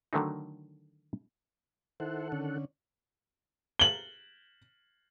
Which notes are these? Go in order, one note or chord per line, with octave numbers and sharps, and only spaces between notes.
D3 D#3 F#3 A3 D4 D#4
D#3 E4 A4 C5 F#5
D3 C#4
F#7 G7